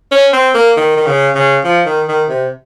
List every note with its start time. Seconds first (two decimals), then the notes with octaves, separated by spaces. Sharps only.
0.11 C#4
0.33 C4
0.54 A#3
0.77 D#3
0.97 D#3
1.06 C#3
1.35 C#3
1.64 F3
1.86 D#3
2.08 D#3
2.29 C3